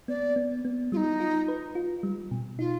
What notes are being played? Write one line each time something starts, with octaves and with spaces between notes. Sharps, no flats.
B3 D5
B3
B3
G3 D#4 F4
F4
B4
F4
G3
B2
D#4 F4